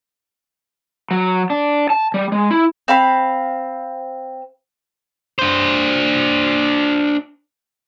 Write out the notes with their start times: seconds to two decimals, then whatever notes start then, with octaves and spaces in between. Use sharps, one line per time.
1.11 F#3
1.50 D4
1.90 A5
2.14 G3
2.32 G#3
2.51 E4
2.88 C4 F5 B5
5.39 D4 C5